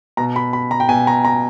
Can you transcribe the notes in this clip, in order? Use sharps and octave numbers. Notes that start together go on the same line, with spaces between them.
B2 A#5
B5
B5
A#5
G5
B2 G#5
A#5
A#5